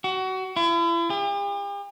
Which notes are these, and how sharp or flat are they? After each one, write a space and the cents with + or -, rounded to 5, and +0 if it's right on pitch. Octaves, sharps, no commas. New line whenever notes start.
F#4 +25
E4 +40
G4 +45